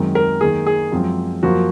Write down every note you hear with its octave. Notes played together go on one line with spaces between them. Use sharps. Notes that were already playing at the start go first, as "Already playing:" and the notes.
Already playing: F#2 D#3 G#3 C4
A#4
F#2 D#3 A#3 G#4
G#4
F#2 F3 G#3 C4
F#2 F3 A#3 F#4